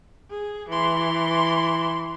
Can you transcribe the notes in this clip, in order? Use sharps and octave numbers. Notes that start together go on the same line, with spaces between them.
G#4
E3 C6